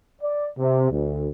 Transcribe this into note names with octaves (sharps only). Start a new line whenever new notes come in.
D5
C3
D2